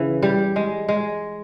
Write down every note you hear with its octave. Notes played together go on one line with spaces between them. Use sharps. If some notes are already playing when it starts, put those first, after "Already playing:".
Already playing: C#3 E3
G3
G#3
G#3